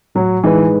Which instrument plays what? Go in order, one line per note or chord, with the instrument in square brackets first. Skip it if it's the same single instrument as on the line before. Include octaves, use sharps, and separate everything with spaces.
[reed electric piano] A2 [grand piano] F#3
[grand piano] E3 [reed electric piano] G#3 D#4 G#4 B4